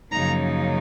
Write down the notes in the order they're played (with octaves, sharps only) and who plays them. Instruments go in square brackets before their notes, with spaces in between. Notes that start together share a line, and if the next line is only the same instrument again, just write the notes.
[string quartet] F#2 C#3 F3 A#3 D#4 A#5